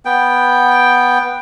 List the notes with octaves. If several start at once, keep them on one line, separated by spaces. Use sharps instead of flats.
B3 G5